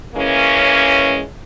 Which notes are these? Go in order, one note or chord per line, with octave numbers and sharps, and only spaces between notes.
E3 G#3 A#3 C#4